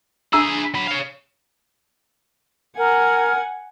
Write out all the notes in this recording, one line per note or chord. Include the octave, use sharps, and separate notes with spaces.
D4 E4 G#4 A#5 E6
F#3 B5
C#5 F5
A#4 F#5 G#5